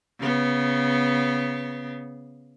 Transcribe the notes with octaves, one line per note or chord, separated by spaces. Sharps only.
C#3 B3